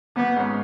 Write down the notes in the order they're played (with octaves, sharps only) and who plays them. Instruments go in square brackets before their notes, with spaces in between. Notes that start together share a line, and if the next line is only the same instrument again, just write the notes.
[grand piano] G#1 [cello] B3
[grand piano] G#2 G#3 C#4